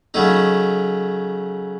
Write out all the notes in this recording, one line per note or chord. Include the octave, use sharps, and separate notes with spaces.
C#3 F#3 A3 D#4